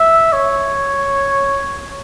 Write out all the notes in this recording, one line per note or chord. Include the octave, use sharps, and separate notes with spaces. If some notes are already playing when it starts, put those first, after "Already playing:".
Already playing: E5
C#5